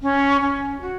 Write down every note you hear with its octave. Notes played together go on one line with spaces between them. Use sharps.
C#4
C#4
F#4